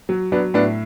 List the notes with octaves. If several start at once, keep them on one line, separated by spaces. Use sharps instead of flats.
F#3
F#3 B3 D4
A2 B3 D4